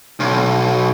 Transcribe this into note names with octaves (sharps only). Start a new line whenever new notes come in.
B1